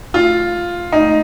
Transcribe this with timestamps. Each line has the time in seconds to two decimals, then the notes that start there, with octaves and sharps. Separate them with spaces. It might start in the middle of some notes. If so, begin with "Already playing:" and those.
0.14 F4
0.92 D#4